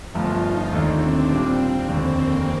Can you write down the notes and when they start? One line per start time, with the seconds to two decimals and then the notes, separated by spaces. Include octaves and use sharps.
0.14 G1 G2 F3 A3 F4
0.43 D#4
0.73 D#2 D3 A3 C4 D#4
1.02 D4
1.30 A#2 G3 C4 D4 F4
1.61 C4
1.89 F1 D#2 D3
2.18 A#3